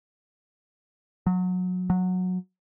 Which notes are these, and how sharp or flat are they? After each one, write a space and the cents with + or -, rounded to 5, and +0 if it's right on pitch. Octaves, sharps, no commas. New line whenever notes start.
F#3 -25
F#3 -15